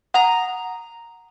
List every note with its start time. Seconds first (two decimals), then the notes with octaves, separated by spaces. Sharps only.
0.14 F#5 A#5 D#6